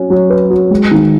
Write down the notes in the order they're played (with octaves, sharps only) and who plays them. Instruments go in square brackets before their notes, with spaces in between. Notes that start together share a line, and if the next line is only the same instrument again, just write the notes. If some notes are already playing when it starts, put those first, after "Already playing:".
Already playing: [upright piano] F#3 C#4 F#4
F#3
B4
F#4
G#3
D#3